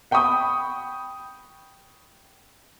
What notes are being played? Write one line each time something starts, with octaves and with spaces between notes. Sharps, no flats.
F#5 G5 B5 C#6 D#6